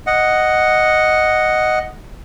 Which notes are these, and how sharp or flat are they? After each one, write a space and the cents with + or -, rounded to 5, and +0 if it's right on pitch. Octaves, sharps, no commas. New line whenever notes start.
D#5 +0 F#5 +0